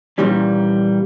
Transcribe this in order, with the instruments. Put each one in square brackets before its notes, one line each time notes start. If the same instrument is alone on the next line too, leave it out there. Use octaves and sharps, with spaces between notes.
[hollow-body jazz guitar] A#2 D#3 E3 G3 C#4